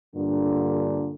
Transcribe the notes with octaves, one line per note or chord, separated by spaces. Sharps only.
G2 A#2 D3